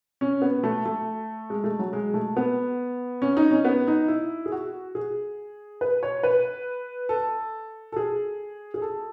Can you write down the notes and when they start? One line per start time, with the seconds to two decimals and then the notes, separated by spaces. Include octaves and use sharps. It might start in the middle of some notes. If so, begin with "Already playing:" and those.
0.21 C#4
0.42 B3
0.64 A3
0.85 A3
1.50 G#3
1.64 A3
1.79 F#3
1.93 G#3
2.14 A3
2.37 B3
3.22 C#4
3.37 D#4
3.51 C#4
3.65 B3
3.87 D#4
4.08 E4
4.46 G#4
4.52 F#4
4.95 G#4
5.81 B4
6.03 C#5
6.23 B4
7.09 A4
7.92 A4
7.96 G#4
8.74 G#4
8.82 A4